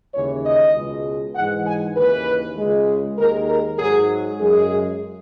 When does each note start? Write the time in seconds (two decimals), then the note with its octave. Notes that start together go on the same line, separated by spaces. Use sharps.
0.14 D#2 C#3 E3 G#3 C#5
0.45 D#5
0.74 C#2 B2 G#3
1.35 G#2 E3 G#3 F#5
1.66 G#5
1.96 D#2 C#3 E3 B4
2.58 C#2 C#3 G#3
3.18 D#2 D#3 G#3 A#4
3.49 A#4
3.79 G#2 F#3 G#4
4.40 F#2 C#3 G#3 G#4